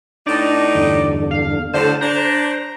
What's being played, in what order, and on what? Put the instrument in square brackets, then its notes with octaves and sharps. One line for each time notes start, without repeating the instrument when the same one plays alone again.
[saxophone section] A2 B3 D#4 [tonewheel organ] D4 [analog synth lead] D5
[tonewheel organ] E2 G2 D3
[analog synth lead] F5
[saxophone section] A2 F#3 C5 [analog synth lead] D3 [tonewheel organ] A5
[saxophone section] D4 [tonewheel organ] C5 [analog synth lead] A#5